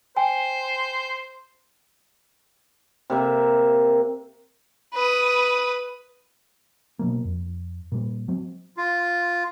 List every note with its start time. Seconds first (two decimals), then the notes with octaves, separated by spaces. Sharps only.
0.17 C5 G5 G#5
3.10 C3 A#3 E5
4.94 B4 D#6
6.99 B2 F#3 A#3
7.25 F2
7.92 A#2 G3
8.28 F#3 C4
8.77 F4